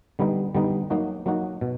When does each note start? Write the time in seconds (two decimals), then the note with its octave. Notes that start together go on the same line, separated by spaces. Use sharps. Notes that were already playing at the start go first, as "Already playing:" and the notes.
0.19 D3 G3 B3 D#4
0.55 D3 G3 B3 D#4
0.90 F#3 A#3 D#4 F#4
1.26 F#3 A#3 D#4 F#4
1.61 B2